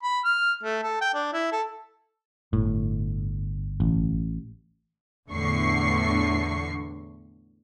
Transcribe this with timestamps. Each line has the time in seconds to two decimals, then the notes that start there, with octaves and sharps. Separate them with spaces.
0.03 B5
0.24 F6
0.63 A3
0.83 A4
1.01 G5
1.14 D4
1.33 E4
1.52 A4
2.53 G1 A2
3.80 A1
5.30 E2 A2 D3 C#6 C7